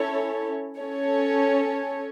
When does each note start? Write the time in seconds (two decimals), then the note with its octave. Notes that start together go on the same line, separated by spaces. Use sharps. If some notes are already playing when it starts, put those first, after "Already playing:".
Already playing: C#4 E4 A4 C#5
0.78 C#4 A4 C#5